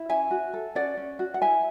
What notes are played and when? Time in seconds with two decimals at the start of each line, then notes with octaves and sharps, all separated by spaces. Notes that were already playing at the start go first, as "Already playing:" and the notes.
Already playing: E4
0.09 C#4 E5 G#5
0.31 F#4
0.54 A4
0.75 C#4 D5 F#5
0.97 C#4
1.19 F#4
1.34 F#5
1.41 E4 E5 G#5